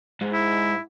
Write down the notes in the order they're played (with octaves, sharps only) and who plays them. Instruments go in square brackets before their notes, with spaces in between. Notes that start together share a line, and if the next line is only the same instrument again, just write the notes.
[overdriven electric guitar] G#2
[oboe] E4